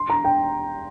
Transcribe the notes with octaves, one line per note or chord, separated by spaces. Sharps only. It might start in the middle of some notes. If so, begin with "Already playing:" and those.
Already playing: C6
A#5
G5